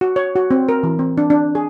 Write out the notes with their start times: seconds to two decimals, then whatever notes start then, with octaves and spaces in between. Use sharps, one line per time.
0.01 F#4
0.16 C#5
0.36 F#4
0.51 C4
0.69 A#4
0.83 E3
0.99 C4
1.18 D4
1.30 D4
1.55 G#4